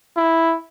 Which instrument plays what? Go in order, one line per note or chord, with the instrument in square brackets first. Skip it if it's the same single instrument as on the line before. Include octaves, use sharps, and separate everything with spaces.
[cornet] E4